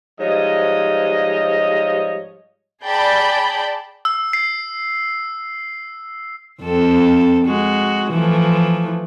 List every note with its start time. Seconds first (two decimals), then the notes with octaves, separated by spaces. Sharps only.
0.20 G#2 F3 G3 C#5 D#5
2.85 G#4 D5 G5 A5 B5 G6
4.05 E6
4.33 C7
6.61 F2 C4 A4
7.46 G#3 F#4
8.11 E3 F3 A3